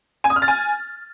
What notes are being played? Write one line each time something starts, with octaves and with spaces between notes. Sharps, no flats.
G#5
D#6
F6
A6
G#5